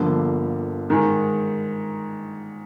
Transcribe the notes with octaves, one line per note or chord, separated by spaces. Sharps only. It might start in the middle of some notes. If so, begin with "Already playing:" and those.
Already playing: G1 G2 D3 F3 A#3
G#2 D#3 G#3